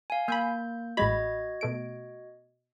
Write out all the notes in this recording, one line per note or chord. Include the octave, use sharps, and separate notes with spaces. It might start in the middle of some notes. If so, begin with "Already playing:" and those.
F5 G#5
A#3 F5 G#5 B5 G6
A1 G#3 F#4 D#5 B5 G#6
B2 A3 D7